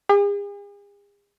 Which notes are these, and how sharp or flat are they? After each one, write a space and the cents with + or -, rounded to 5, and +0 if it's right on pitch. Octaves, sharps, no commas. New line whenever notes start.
G#4 -45